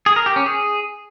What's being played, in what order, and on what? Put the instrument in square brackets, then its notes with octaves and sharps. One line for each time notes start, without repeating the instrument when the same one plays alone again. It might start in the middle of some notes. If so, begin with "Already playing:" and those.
[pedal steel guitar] G#4
A#4
G4
C#4
G#4